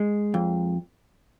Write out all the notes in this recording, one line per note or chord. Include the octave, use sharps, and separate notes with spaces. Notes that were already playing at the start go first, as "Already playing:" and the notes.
Already playing: G#3
F2